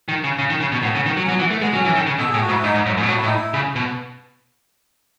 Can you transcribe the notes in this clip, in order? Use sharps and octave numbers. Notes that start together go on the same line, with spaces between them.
D#3
C#3
C#3
D#3
C#3
B2
A2 B3
C#3
D#3
F#3
C#4
F#3 B3
E3
A3
G#3 B3
F#3 C#4
E3
D#3
C#3
B2 A4
A2 G#4
F#4
G#2
E4
G#2 D#4
G#2
F#2
G#2
B2
A2 F#4
E4
A2
D#4
E4
C#3
B2